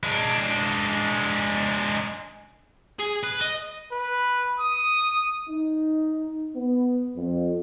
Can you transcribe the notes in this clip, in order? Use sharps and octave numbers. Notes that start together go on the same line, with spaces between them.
G#3 D4
G#4
B4
D#5
B4
D#6
D#4
B3
F2